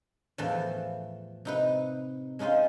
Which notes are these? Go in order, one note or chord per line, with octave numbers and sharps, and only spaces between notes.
E2 A2 E3 F3
C3 D#4 B4
G#3 C#4 D#4 F4 C5